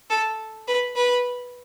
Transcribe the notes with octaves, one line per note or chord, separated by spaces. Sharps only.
A4
B4
B4